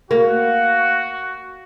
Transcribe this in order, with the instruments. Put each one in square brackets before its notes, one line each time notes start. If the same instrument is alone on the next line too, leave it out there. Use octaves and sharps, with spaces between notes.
[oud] A#3 [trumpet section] F#4